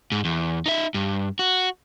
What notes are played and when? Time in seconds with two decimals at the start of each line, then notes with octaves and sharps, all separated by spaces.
0.12 G#2
0.25 E2
0.66 D#4 E5
0.94 G2
1.39 F#4